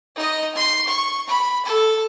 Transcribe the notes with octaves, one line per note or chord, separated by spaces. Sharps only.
D#4 D#5
C6
C#6
B5
A4